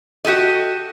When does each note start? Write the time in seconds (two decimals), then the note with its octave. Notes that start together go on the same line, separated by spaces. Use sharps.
0.25 F#4 G4 A4 D#5